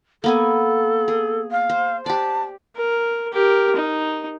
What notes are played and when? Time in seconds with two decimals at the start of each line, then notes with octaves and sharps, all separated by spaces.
0.24 A#3 B3 A4 G#5
1.08 G#4
1.51 F5
1.69 C5
2.06 G4 D5 A5
2.76 A#4
3.33 G4 A#4
3.76 D#4